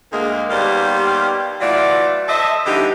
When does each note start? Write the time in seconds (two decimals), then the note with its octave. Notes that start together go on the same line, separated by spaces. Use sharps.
0.12 D2 G#3 A#3
0.50 D#2 G3 B3 C5 D5 F5
1.61 E3 F#3 A3 F4 D5
2.28 A4 C5 D#5 E5
2.66 D3 E3 G3 B3 D#4 G4